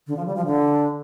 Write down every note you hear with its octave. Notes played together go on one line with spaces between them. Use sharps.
D3
F3
G3
F3
D3